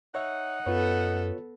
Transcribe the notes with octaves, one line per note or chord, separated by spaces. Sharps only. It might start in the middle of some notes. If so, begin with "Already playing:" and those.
D#4 C#5 E5 F#5
F#2 B3 F4 A4 B4 C#5